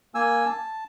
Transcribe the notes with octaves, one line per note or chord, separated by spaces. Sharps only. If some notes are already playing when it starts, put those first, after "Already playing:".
A#3 G#5 E6
A5